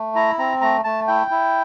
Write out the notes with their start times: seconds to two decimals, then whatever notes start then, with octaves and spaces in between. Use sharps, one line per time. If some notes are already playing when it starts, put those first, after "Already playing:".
Already playing: A3
0.15 E4 A#5
0.39 C4 A#5
0.61 A3 A#5
0.84 A3 A5
1.07 E4 G5
1.31 E4